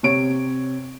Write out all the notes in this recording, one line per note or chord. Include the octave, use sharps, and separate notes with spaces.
C3 C#5 D7